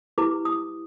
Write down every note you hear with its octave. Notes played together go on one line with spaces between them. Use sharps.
E4 G4 B4 D6
D#6